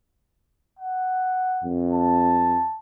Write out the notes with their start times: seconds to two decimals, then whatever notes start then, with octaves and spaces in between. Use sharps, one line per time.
0.79 F#5
1.64 F2
1.93 A5